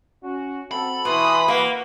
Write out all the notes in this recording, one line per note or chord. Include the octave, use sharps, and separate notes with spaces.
C#4 F#4
C4 F#4 A4 B5
B2 E3 C6 D#6
A#3 F#4 B4